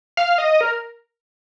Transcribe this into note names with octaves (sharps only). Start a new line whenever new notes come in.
F5
D#5
A#4